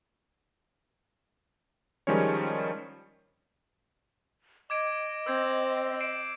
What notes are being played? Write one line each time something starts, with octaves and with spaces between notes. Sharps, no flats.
D#3 F3 G3 G#3 C#4 C#5
D#5 D6 G#6 D7
C4 E6 G6 G#6
C7 D7 E7